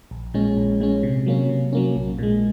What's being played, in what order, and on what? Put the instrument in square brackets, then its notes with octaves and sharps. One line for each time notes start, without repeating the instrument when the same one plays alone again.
[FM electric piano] A#1
A#2 G#3 C#4
A#1
A#2 G#3 C#4
C3
F#3 A#3 C#4
C3
F#3 A#3 C#4
A#1
A#2 G#3